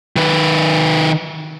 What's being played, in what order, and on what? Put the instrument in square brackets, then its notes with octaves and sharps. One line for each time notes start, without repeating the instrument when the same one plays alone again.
[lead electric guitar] D#3 B4